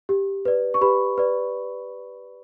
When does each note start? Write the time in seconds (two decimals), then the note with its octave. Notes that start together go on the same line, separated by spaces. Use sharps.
0.09 G4
0.45 B4 D5
0.74 C#6
0.81 G4 B4 B5
1.18 B4 D5